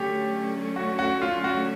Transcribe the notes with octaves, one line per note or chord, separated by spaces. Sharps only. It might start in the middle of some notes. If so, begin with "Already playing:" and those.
Already playing: D3 F#3 A3 C#4 G4
F#4
F#4
F4
F#4